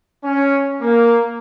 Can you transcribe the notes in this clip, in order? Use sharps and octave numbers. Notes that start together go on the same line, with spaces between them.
C#4
A#3